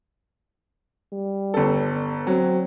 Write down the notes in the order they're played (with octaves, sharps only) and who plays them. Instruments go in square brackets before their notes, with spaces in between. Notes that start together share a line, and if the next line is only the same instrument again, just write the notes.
[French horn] G3
[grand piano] G1 A4
[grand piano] F#3 [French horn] C4